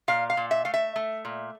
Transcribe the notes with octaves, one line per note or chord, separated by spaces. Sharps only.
A#2 F5
F5
A#2
E5
A3 F5
E5
A3
A#2